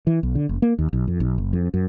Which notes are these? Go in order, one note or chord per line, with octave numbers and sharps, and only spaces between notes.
E3
B1
D3
F#1
A#3
D#2
B1
F2
B1
F#1
F2
F#2